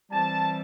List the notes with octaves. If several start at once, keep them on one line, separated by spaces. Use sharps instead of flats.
E3 G3 C4 A5